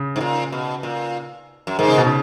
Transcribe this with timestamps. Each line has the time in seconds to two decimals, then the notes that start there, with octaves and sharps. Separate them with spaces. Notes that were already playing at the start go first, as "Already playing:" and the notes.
Already playing: C#3
0.16 G#2
0.21 A#2
0.52 B2
0.83 A#2
1.67 F#2
1.79 G#2 D#3
1.88 C#3
1.97 B2
2.06 C#3